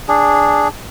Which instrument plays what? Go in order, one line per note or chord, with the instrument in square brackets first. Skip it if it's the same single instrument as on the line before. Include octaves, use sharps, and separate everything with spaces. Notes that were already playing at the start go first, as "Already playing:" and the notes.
[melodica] D4 G#4